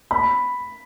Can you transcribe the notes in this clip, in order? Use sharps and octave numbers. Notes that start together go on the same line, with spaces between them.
B5